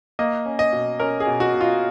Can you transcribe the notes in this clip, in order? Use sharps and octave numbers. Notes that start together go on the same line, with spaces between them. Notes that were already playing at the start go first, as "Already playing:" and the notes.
A#3 D#5
C#4
D#5
B2
C#4 A#4
G#4
B2
F#4
B2
F4